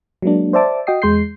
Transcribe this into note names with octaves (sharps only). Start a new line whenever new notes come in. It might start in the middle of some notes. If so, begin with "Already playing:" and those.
F#3 G#3 A#3 D4
C5 D5 E5 A5 D6
F#4 D#5 G5 D#6 C7
E2 G#3 C6 G6 C7